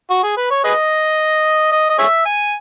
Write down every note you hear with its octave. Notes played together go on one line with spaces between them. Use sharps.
F#4
G#4
B4
C#5
G#4 B4 D#5
D#5
D#5
G#4 C#5 E5
G#5